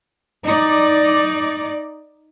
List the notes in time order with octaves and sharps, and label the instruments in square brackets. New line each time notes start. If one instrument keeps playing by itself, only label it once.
[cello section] D#4 D5